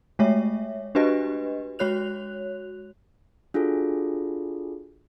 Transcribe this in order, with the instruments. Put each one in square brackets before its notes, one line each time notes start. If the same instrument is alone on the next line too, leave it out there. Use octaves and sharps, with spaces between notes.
[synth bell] G#3 A3 C#5 E5
D4 F#4 G4 B4 D#5
G#3 F#4 C#5 F#6 F7
[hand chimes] D4 F4 F#4 G#4 A4